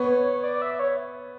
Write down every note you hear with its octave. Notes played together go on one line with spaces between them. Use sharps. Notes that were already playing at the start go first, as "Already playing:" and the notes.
Already playing: B3 C#5
D5
E5
C#5